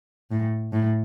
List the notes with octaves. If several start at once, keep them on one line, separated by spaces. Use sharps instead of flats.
A2
A2